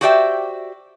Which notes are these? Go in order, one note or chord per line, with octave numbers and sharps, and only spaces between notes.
F#4 G4 C5 D5 E5 G5